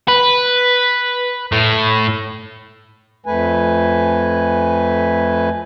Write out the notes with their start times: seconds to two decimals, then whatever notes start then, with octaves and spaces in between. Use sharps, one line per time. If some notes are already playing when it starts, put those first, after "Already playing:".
0.08 B4
1.52 A2
3.26 F2 A3 B4 G#5